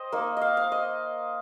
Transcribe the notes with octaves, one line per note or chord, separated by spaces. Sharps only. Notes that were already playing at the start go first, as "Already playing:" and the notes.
Already playing: C5 D#5 G5
A#3 D#4
D#5 F5
F5
D#5